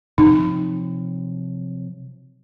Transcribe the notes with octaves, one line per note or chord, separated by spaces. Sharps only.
C3 F3 F#3 D#4